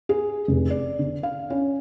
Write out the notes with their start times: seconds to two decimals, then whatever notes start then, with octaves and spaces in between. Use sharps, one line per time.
0.09 G#4
0.48 F1
0.70 D5
0.99 D3
1.23 F5
1.50 C#4